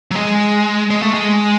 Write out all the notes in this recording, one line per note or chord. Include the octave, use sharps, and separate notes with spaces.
F#3
G#3
G#3
A3
G#3